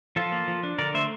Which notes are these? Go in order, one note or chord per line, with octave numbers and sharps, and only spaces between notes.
F3 F4 A4
A#3
F3
D4
D3 A#4 D5
A3 C5 E5